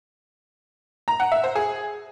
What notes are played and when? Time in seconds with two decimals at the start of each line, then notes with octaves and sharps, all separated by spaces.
1.08 A#5
1.20 F#5
1.32 E5
1.44 C5
1.55 G#4